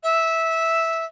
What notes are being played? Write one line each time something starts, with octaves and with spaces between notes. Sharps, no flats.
E5